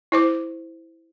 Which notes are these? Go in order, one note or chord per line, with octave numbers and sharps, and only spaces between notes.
E4 C5 D6